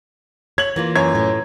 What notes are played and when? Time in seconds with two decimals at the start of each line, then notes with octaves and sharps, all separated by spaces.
0.58 C#5 G#6 F#7
0.76 E3 A#3 F4
0.95 F#2 C#5 G#6
1.15 A2